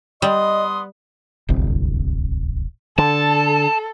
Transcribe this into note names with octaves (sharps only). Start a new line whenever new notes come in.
G3 B3 D#5 C6 D#6
D1 G1 C2 C4
D3 A4 A5